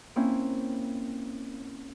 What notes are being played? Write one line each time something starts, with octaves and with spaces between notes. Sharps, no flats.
A#3 C4 C#4 E4